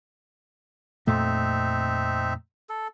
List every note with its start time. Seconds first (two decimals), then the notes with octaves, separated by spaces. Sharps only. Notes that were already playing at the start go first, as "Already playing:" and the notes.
1.07 F2 A#2 A3 C4 D#4 E5
2.69 A4